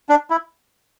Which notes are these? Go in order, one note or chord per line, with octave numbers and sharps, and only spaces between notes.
D4
E4